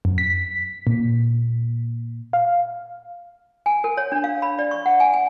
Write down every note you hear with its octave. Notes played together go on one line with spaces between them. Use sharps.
F#2
B6
A#2
F5
G#5
A#4
C#5
D4
F5
B5
D5
C#6
F#5
G#5
G#5